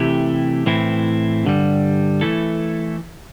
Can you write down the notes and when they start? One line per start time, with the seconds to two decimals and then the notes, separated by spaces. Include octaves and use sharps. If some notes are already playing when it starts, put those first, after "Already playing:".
Already playing: C3 E3 A3 E4 G4
0.66 A2 E3 C4 E4
1.45 G2 D3 G3
2.21 E3 A3 E4 A4